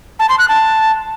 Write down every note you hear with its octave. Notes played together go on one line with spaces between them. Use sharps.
A5
C6
F#6
A5